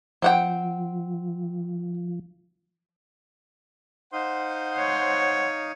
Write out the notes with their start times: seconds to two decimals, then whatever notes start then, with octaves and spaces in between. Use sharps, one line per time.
0.22 F3 C4 F#5 G5
4.13 D#4 C5 F5 F#5 D#6
4.79 C#5